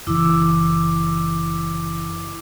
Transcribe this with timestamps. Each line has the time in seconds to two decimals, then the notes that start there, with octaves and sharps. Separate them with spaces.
0.07 F#1 E3 E4 D6 E6